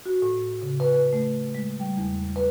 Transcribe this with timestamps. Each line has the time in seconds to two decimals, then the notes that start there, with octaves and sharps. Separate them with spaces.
0.05 F#4
0.22 A2
0.62 C#3
0.80 B4
0.93 B4
1.13 A3
1.55 G#3
1.80 G3
1.97 E2
2.36 B4